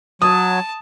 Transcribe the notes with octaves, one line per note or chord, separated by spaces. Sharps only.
F#3 A5 D#6